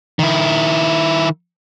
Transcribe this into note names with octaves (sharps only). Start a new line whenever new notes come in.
D#3 E4